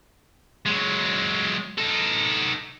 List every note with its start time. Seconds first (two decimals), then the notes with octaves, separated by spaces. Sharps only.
0.66 F#3 G#3
1.78 D#4 A4